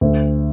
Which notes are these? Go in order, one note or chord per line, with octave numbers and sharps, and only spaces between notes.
D2